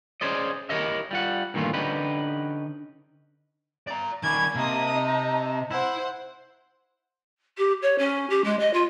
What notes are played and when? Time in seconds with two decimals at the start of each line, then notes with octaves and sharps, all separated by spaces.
0.21 C#4 G#4 C5 D5 D#5
0.69 E4 G4 A#4 C#5 D#5 E5
1.11 G3 F4 F#5
1.54 G2 A#2 D#3 E3 A3 F4
1.73 D3 C#4 D#4 G4 B4
3.87 D5 A#5
4.23 D#3 D5 G#5 B5 C#6 G#6
4.55 C3 A#3 D#5 A5 A#5 D#6
4.93 D#4
5.71 E4 C5 F#5
7.57 G4
7.82 C#5
7.98 C#4
8.30 G4
8.44 G#3
8.59 D#5
8.73 F4